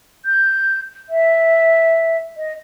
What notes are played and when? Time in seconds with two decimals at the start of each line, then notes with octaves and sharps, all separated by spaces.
0.25 G6
1.09 E5
2.37 D#5